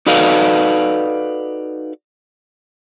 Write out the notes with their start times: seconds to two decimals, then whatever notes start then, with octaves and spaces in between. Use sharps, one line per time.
0.06 D#4 F#4 A4 B4 D5 F5